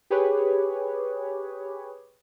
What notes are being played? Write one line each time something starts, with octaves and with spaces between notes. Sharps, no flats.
G4 G#4 B4 C#5